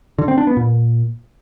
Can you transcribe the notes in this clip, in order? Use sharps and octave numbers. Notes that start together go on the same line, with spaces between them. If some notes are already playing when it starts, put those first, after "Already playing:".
D3
C4
D4
B3
A#2